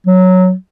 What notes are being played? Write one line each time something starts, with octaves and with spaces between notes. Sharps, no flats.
F#3